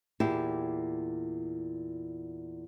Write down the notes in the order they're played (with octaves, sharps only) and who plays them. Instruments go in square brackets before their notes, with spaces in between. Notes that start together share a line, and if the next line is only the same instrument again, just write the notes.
[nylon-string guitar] E2 A#2 E4 G4 A5